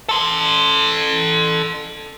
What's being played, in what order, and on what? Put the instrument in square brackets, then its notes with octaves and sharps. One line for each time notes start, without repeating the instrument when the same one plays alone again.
[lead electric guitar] A4 C6